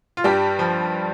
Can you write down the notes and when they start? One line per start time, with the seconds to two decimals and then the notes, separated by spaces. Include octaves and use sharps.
0.17 F4
0.24 G2 G3 G4
0.59 F3